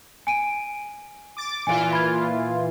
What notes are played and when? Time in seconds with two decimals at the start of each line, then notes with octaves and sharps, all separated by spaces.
0.27 G#5 D7 D#7
1.37 D6 A6
1.67 A#2 E3 F4 G#5 D7
1.93 B5 G#6